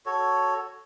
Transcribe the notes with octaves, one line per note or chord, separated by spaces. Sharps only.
F#4 A4 C#5